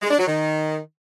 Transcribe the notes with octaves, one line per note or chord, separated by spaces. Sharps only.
G#3
D4
F#3
D#3